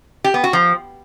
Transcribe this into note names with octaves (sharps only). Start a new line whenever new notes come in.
G4
B3
F#4
F3